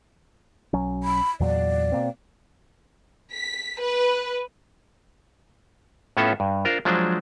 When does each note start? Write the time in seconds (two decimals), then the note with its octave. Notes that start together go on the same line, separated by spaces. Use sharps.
0.73 B1 F#3 C#4
1.03 B5
1.40 E2 A#2 F#3 D5
1.92 B2 A#3 C4
3.32 B6
3.82 B4
6.17 A2 B3 C#4 F4 A4 E5
6.40 G2
6.65 D4 F4 A#4 C5
6.85 F3 F#3 G#3 D4 C5